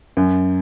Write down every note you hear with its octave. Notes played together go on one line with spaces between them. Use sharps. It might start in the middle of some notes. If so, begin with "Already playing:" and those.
F#2